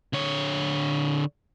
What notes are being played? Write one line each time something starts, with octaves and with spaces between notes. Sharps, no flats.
D3 C#5